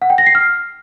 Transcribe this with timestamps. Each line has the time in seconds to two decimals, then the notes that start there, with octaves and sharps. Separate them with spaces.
0.02 F#5
0.10 G5
0.18 A#6
0.26 C7
0.35 F6